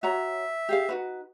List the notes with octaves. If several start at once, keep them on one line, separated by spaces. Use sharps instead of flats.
F#4 C#5 E5 A#5
G4 G#4 F5
D#4 F#4 B4